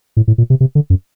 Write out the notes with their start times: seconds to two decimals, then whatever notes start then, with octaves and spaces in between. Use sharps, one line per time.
0.17 A2
0.28 A2
0.38 A#2
0.50 C3
0.60 C3
0.75 D3
0.90 F#2